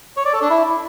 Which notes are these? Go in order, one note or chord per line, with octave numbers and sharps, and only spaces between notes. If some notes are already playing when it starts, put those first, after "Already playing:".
C#5
D5
A4
D4
E4